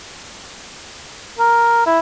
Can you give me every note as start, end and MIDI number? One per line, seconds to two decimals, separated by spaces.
1.39 1.85 70
1.86 1.99 64